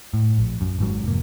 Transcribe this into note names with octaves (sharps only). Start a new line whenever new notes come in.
A2
A#1
F#2
G#1 G#2 F#3
F1 A#3